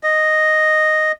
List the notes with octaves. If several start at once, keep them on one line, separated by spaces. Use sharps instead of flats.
D#5